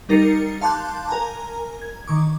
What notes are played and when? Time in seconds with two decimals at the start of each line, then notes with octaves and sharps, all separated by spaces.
0.09 G3 D#4 A#4 A6 C7 C#7
0.61 F5 A5 C6 D6 F#6 G6
1.09 A#4 G#5 A#5
1.82 G#6
2.08 D#3 C#6 D6